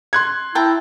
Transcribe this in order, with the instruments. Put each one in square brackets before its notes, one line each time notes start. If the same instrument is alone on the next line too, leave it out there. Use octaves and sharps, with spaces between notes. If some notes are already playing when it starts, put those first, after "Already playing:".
[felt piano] C6 F#6 G#6
[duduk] E4 [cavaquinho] G5 A5 A#5